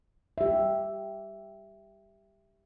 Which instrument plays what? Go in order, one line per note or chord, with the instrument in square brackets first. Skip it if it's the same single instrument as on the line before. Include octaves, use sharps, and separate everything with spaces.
[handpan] G4 E5